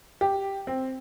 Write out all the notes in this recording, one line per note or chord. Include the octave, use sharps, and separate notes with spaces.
G4
C4